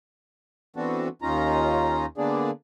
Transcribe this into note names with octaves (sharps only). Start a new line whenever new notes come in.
E3 B3 C4 D4 F#4 A4
D#2 C#4 D#4 F4 A#5
D3 A#3 B3 D4 G#4 D5